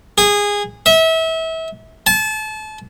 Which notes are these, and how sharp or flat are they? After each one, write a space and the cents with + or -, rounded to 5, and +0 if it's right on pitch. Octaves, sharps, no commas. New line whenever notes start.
G#4 -20
E5 -30
A5 -30